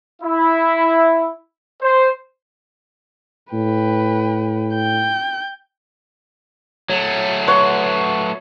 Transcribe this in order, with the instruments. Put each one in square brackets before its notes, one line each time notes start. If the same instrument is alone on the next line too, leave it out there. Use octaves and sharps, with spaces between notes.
[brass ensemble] E4
C5
[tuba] A2 [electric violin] B4 G5
[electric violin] G5 G6
[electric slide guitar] F#3 A3 [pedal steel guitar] C#5
[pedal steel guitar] B4 F#5 C6 [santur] C#5